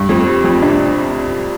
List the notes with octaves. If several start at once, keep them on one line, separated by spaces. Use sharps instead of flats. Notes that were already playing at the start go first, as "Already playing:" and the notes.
Already playing: G2
F2
G3
F2
C3 D4